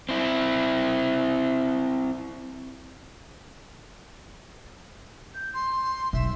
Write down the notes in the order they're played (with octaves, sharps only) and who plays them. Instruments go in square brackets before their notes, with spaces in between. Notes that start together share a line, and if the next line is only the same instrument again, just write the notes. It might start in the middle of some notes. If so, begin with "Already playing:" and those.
[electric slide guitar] C4 E4
[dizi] G6
C6
[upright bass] B1 [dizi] E5